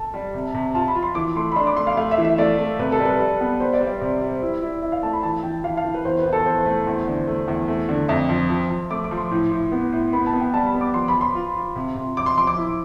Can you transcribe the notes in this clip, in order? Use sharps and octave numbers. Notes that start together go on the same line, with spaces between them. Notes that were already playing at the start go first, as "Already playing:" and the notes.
Already playing: A4 A5
G3
C3
C3
F4 A5
B5
F4
C6
E3 D6
A3 C6
B5
D4 C6
D6
A3 C6
F5
A3 F5
E5
E3
E5
A3 D5
A3
C3 B4
A4
G3
B4
G3
B3
G3 C5
D5
G3
D5
C3
G3
E4
E4
E4 E5
F5
A3 A5
B5
E3 A5
E3 G5
E3 F5
F5
E3
B4
E2 C5
B4
E2
A4
E2 C5
A3
E2
D3
A3
E2
A3
D3
F2 E5
F3
F3
F3
A3 D6
D6
F3
C6
A2
A2
B3
A2
B3 B5
A5
B3
G5
G3 A5
B5
B3
D6
F3 C6
B5
F3
C6
F4
F4
C3
C3
F3 D6
C6
F3 C6
D6
E4